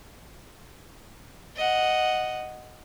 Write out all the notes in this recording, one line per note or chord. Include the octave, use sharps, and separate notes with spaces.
D#5 F#5